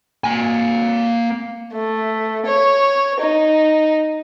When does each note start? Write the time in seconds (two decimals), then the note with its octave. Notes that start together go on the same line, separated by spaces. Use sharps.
0.24 A#3 G#5
1.73 A3
2.46 C#5
3.20 D#4